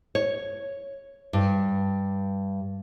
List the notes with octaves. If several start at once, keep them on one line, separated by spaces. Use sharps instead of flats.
C#5
G2